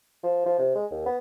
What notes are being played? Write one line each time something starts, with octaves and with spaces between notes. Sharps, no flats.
F3
F3
C3
G#3
D#2
B3